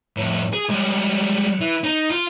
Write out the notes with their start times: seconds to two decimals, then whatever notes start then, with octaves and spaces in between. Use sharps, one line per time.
0.17 F2 A2
0.53 G#4
0.69 G3 G#3
1.60 E3
1.84 D#4
2.10 F4